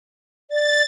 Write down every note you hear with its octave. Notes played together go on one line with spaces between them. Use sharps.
D5 A6